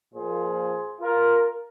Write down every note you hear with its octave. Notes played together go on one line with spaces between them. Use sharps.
A#2 F3 A#3 G#4 C5
F4 A#4